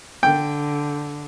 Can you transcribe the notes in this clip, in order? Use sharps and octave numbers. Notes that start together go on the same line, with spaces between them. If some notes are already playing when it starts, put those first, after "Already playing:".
D3 G5